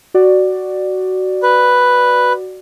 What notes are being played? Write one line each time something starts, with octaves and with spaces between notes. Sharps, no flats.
F#4 D5
B4